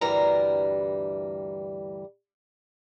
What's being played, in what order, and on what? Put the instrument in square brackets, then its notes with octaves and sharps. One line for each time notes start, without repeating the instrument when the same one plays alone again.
[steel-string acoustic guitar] D2 G2 E3 G3 A#4 A#5